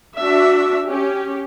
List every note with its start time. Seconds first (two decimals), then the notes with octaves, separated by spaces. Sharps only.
0.19 D4 F#4 E5
0.88 C#4 G4